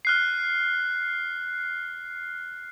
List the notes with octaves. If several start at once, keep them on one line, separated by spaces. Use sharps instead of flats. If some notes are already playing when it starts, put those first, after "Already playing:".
F6 F#6 C7